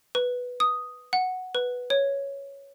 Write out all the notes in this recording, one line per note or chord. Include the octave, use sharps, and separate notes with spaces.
B4
D#6
F#5
B4
C#5